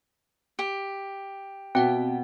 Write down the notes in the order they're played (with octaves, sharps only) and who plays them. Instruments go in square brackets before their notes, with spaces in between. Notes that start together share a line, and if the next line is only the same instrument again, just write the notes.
[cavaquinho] G4
[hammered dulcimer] B2 [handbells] C4 F#5 [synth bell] G5